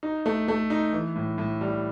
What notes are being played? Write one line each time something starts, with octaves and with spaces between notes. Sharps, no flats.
D#4
A3
A3
D#4
E3
A2
A2
G3